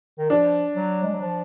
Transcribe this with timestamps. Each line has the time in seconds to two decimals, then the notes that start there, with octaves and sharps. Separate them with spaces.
0.19 D#3
0.30 F3 D4
0.76 F#3
1.03 G#3
1.13 F#3
1.21 F3